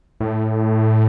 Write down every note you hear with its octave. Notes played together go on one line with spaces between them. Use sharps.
A2